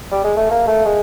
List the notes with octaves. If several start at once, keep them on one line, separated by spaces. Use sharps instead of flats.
G3
G#3
A3
A#3
A3
G#3